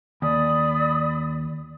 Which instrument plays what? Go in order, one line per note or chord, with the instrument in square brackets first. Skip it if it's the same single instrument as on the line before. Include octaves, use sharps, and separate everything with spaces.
[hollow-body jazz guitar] D#2 [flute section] D5 B5 D#6